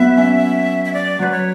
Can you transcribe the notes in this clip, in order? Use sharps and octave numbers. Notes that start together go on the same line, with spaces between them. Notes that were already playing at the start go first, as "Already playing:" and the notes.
Already playing: F#3 B3 E5
C#4
E5
D5
F#3 B4
C#5